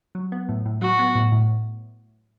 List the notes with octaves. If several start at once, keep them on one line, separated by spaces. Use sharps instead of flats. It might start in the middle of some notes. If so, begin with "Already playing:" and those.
F#3
B3
A2
A2
F#3 F#4
B3
A2
A2